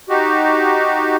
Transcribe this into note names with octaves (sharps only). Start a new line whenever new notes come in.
D#4 F#4 G4